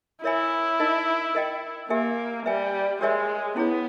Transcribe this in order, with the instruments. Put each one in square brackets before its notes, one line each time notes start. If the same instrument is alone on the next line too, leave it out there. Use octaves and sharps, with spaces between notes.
[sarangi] E4 [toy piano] A#4 C#5 E5 G#5 B5
[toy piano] D#4 A#4 D#5
A#4 D#5 G5
[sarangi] A#3 [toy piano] G4 A#4 E5 G#5
[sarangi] G3 [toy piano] B4 E5 G#5
[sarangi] G#3 [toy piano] G4 A#4 C#5 E5 G#5
[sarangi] B3 [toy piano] C#4 E4 G#4 C#5